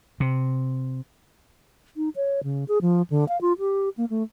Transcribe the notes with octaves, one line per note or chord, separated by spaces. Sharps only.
C3
D#4
C#5
C#3
G#4
F3
D3
F5
F4
G4
A#3
A3